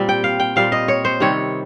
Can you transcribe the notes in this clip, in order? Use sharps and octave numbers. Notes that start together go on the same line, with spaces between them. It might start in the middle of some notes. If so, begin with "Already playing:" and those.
Already playing: A#2 G3 C4
G5
F5
G5
A#2 G3 C4 F5
D#5
C#5
C5
C3 D#3 G3 C4 C#5